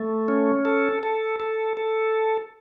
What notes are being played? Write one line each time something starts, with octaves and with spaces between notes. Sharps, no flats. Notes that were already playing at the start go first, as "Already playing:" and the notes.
Already playing: A3
C#4
A4
A4
A4
A4